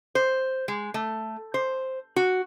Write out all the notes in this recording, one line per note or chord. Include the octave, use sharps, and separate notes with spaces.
C5
G#3
A3
C5
F#4